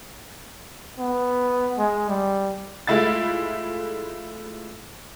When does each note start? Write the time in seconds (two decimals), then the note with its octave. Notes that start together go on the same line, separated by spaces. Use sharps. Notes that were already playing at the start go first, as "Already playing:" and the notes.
0.99 B3
1.78 G#3
2.09 G3
2.87 G#3 A3 E4 F4 A6